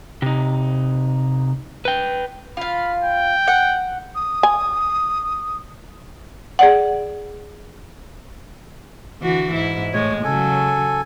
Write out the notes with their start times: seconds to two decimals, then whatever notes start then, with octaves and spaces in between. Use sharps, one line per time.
0.22 C3 D#4
1.85 B4 G5
2.57 F4 F5 B5
3.03 G5
3.48 F#5
4.15 D#6
4.43 G#5
6.59 G#4 D5 F#5
9.21 D3 E3 F#4
9.54 G#2 E4
9.93 A2 G#3 C#5
10.24 C#3 F#3 A4 G#5